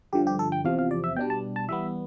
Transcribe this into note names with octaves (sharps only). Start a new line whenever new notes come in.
G2 D3 F3 G4
G4
A4
G5
E2 C3 F3 F5
F5
D5
E5
B2 G3 D4 G5
A5
A5
E3 G3 B3 E5